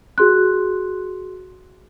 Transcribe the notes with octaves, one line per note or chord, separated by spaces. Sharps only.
F#4 G#4 C6 F#6